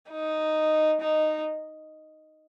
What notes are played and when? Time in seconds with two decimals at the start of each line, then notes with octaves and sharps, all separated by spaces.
0.11 D#4
1.00 D#4